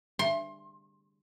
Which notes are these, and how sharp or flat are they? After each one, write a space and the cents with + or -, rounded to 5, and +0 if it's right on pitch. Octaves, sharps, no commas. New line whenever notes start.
C6 +25